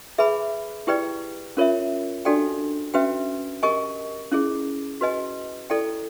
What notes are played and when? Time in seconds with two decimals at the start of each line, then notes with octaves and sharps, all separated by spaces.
0.18 G#4 B4 E5 G#5 B5
0.87 E4 G4 B4 D5 G5
1.57 C#4 F4 A#4 C#5 E5
2.25 D4 F#4 A4 D5 G5
2.94 C#4 F#4 B4 E5 G5
3.63 G4 A#4 D#5 G#5 C#6
4.32 C#4 E4 G#4
5.01 F#4 B4 D#5 G#5
5.70 E4 A4 D5 G5